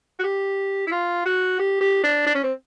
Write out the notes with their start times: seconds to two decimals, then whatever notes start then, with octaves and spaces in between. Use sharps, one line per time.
0.19 F#4
0.24 G4
0.87 E4
0.91 F4
1.26 F#4
1.59 G4
1.81 G4
2.04 D4
2.26 D4
2.35 C#4
2.43 C4